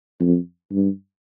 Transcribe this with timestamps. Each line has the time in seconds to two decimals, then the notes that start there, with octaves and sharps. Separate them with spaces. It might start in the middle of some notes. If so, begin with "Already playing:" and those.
0.20 F2
0.72 G2